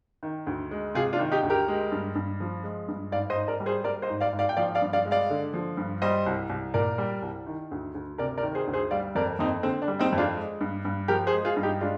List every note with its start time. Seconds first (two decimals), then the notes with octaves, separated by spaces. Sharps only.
0.23 D#3
0.47 D2
0.71 G#3
0.95 C3 F4 G#4
1.13 D4 F4
1.19 D#3
1.32 D#4 G4
1.43 D2
1.50 G4 A#4
1.68 G#3
1.92 G2
2.15 G2
2.40 F3
2.63 G#3
2.88 G2
3.12 G#2 D5 F5
3.30 C5 D#5
3.36 G#2
3.48 A#4 D5
3.60 G3
3.66 G#4 C5
3.84 G3 A#4 D5
4.02 C5 D#5
4.09 G#2
4.21 D5 F5
4.33 G#2
4.39 D5 F5
4.49 G5
4.57 F3 D5 F5
4.75 D5 F5
4.82 G2
4.93 D5 F5
5.05 G#3
5.11 D5 F5
5.30 D3
5.54 F3
5.77 G2
6.02 G3 C5 D#5
6.26 C2
6.50 C2
6.74 A#2 A#4 D5
6.98 G3
7.22 C2
7.46 D#3
7.71 D2
7.95 D2
8.18 C3 A#4 D5
8.38 A#4 D5
8.43 D#3
8.55 G#4 C5
8.67 D2
8.73 G#4 C5
8.91 G3 D5 F5
9.15 F2 A#4 D5
9.39 F2 C4 D#4
9.63 D3 C4
9.82 D4
9.88 G3
9.99 C4 D#4
10.12 F2
10.18 D4 F4
10.36 G#3
10.61 G2
10.85 G2
11.08 F3 G4 A#4
11.27 G#4 C5
11.32 G#3
11.45 F4 G#4
11.56 G2
11.63 D#4 G4
11.81 G#3 D4 F4